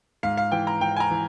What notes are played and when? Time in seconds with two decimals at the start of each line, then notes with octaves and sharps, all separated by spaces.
0.23 G#2 F5
0.37 F5
0.52 E3 G5
0.67 A#5
0.81 G#2 G5
0.96 G#5
1.00 A#5
1.10 E3